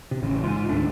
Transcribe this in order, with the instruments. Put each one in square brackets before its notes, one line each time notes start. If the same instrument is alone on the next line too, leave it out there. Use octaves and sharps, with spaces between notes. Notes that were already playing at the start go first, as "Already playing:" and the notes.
[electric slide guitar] C3
[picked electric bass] A1 [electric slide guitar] C#3
[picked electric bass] G#2 [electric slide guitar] F4 G#5
[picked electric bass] D#2 A2 D4 [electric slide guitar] A3